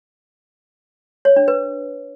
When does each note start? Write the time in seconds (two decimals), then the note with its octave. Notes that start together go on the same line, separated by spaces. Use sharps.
1.25 C#5
1.36 D4
1.48 B4